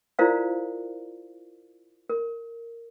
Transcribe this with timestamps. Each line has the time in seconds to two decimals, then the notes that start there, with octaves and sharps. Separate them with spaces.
0.19 E4 F4 A#4 C5 D5 F5
2.09 A#4